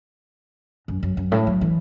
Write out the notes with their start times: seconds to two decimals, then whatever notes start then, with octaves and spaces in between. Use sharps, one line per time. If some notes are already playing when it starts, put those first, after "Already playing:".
0.88 F#2
1.03 F#2
1.17 F#2
1.32 A2
1.47 F#3
1.61 E3